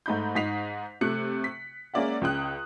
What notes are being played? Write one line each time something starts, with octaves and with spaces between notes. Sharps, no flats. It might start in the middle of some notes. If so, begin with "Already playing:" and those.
G#2 A3 D#4 B5 G6
G#2 D#4 B6 C7 F7
C3 A3 F#6 C#7
B6
G#3 A#3 C#4 D5 E5 F#5
C#2 C#3 G5 D#6 F#6